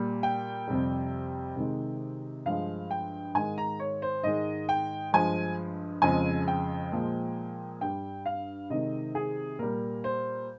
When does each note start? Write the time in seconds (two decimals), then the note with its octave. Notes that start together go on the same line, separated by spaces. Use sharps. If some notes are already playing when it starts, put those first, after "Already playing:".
Already playing: A#2 G3
0.23 G5
0.68 F2 C3 G3
1.56 C3 D#3 G#3
2.46 G2 F3 G#3 F5
2.91 G5
3.34 G#2 D#3 G#3 G#5
3.58 A#5
3.80 C#5
4.02 C5
4.24 G#2 D#3 G#3 D#5
4.69 G5
5.13 G2 F3 G#3 G#5
6.02 F2 C#3 F3 G#3 G#5
6.48 G5
6.92 A#2 F3 G#3
7.81 G2 G3 G5
8.26 F5
8.70 C3 D#3 G#3 D#5
9.15 G#4
9.59 A#2 G3 A#4
10.04 C5